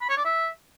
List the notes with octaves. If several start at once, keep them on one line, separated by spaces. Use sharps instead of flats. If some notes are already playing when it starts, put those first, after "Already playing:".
B5
C#5
D5
E5